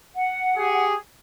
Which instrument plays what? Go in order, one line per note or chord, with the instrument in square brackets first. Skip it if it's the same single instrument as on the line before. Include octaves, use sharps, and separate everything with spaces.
[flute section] F#5
[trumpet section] G4 G#4